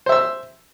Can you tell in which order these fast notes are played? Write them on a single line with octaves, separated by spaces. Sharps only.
C5 E5 E6